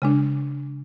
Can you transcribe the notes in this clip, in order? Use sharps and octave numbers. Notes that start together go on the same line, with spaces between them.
C#3 G#3 D4